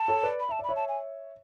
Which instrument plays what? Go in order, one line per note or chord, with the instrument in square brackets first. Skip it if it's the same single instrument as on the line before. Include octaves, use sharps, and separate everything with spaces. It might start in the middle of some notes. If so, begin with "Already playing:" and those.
Already playing: [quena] A5
[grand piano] A4 C#5
B4 D5
[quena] B5
[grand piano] E5 [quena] A5
[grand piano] D5
[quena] B5
[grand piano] C#5 E5
[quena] A5
G#5